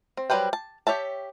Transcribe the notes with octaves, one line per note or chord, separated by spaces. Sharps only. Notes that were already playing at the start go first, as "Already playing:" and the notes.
C4
F#3 G3 B4 C5 G5
A5
G4 C#5 E5 A5